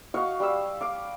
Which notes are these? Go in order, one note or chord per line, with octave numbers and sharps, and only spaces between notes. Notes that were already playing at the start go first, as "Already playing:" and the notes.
F#4 D#5 F5 C#6
G3 G4 F5 E6
F5 D6